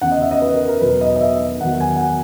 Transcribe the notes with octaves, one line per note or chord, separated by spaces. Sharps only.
E2 C#3 E3 F#5
D#5
E5
D#5
B4
A#4
A#4
E2 B2 F#3 B4
D#5
D#5
E5
E2 D#3 F#3 F#5
G#5
F#5
G#5